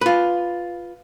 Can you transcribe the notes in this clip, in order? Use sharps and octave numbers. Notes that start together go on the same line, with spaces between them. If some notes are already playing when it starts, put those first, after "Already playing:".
F4 B4